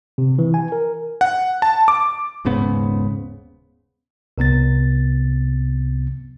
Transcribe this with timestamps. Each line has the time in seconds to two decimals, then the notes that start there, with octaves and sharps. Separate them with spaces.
0.18 C3
0.39 E3
0.54 G#5
0.72 A#4
1.21 F#5
1.62 A5
1.88 D6
2.45 D#1 G#2 C#3 B3
4.38 C2 C3 B3 A6